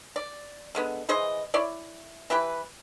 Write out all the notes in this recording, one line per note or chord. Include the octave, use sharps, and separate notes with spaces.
D5
D3 G#3 B3
E3 G#4 C5 D#5
E4 C#5 D5
E3 E4 G4 B4